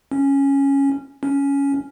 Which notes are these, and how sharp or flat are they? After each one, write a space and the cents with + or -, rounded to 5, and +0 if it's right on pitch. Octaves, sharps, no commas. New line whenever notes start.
C#4 -5
C#4 +10